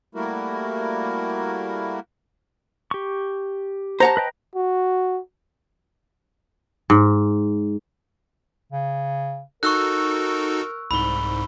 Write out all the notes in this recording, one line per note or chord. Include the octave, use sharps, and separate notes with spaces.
G3 A3 A#3 E4 F#4 A#4
G4 C#6
C5 F#5 A5 A#5
B4 D#5 G5
F#4
G#2
C#3
D#4 F#4 A4 A#4 C#6 E6 F#6
C2 G#2 B5 G7